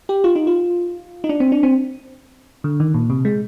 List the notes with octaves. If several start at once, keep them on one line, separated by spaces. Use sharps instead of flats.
G4
F4
D#4
F4
D#4
D4
C4
D4
C4
D3
D#3
A#2
C3
G#3